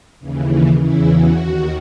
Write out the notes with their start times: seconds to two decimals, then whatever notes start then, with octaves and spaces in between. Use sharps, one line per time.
0.20 D#2 C#3 E3
0.80 E2 C#3 E3 E4
1.10 F#4
1.40 D#2 D#3